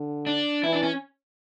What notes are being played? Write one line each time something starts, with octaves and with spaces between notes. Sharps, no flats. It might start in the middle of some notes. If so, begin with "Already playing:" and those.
Already playing: D3
D4
E3 E4
D4
C#4